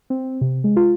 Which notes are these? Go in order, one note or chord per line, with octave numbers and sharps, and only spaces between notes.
C4
C3
G#3
F4